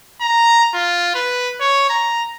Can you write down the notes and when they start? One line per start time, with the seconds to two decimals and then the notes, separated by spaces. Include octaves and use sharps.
0.21 A#5
0.74 F4
1.15 B4
1.60 C#5
1.90 A#5